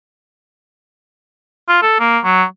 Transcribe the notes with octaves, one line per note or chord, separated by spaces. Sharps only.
F4
A4
A#3
F#3